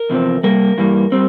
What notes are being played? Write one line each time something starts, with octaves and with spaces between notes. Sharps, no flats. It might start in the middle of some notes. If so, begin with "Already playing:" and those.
Already playing: A#4
E2 C3 F3 C4
C3 G3 A#3 A#4
G2 E3 G3 A#3
G3 C4